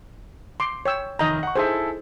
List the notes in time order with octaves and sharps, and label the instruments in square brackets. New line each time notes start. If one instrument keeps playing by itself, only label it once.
[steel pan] C6 D6
C#5 G5 E6
[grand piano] F1 D#3 G6 [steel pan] D#5 A#5
[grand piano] F#5 C#6
[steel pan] D#4 G#4 C5 [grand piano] E4 A4 G#5